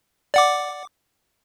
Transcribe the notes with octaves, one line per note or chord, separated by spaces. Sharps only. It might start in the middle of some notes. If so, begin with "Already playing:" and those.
D5 F#5 D6